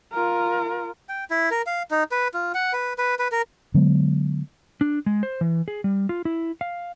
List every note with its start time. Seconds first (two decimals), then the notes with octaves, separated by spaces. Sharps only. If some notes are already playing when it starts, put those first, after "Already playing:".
0.12 F4 A#4
1.09 G5
1.30 E4
1.51 A#4
1.67 F5
1.91 D#4
2.12 B4
2.34 F4
2.54 F#5
2.73 B4
2.98 B4
3.19 B4
3.32 A#4
3.74 D3 F#3 G#3 B3
4.81 D4
5.06 G#3
5.23 C5
5.41 E3
5.68 G#4
5.84 G3
6.09 F4
6.25 E4
6.61 F5